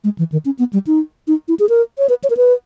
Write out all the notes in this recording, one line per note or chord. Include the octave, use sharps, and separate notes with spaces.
G#3
E3
D#3
C#4
B3
G3
D#4
D#4
E4
G#4
A#4
C#5
B4
C#5
A#4
B4